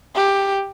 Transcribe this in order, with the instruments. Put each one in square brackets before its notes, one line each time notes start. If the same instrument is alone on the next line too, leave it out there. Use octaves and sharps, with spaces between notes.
[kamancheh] G4